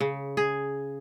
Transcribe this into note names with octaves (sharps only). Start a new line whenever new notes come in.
C#3
G#4